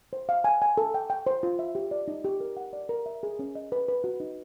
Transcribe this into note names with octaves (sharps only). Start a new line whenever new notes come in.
C5
F5
G#5
G#5
A4
G5
G5
C5
F4
E5
G4
D5
D#4
G4
A#4
F#5
D5
A#4
E5
G#4
C#4
D#5
B4
B4
F#4
D#4